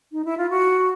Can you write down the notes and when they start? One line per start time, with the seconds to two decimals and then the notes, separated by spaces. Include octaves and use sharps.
0.12 D#4
0.25 E4
0.38 F4
0.50 F#4